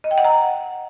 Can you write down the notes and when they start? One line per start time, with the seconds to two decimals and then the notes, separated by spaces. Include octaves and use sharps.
0.04 D#5
0.11 G5
0.18 F#5
0.24 A#5